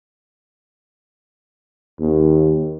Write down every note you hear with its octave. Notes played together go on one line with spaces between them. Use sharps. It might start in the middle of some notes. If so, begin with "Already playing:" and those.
D#2